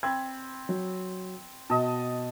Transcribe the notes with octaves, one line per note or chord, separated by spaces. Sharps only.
C4 B5 G#6
F#3
B2 D#5 A5